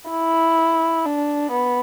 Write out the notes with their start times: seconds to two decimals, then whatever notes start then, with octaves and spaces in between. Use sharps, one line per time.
0.11 E4
1.06 D4
1.52 B3